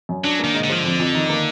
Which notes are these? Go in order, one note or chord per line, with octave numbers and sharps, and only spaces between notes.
F#2
F#3 D4
A#3
D#3
G#2
D3
D#3 F3
D3
F2
F2
D#3
A#3